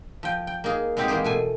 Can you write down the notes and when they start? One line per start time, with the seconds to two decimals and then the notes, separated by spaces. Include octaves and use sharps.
0.23 F3 G5
0.47 G5
0.64 A#3 D#4 G#4
0.97 G#3 B3 C4 D#4 G4 G#4
1.08 E3 G#3 A#3 G4 G#4
1.24 B2 A3 G#5